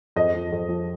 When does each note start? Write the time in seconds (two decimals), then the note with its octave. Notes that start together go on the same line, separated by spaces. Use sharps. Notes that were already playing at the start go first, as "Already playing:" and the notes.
0.16 F2 D#5
0.34 F3
0.52 F2
0.69 F3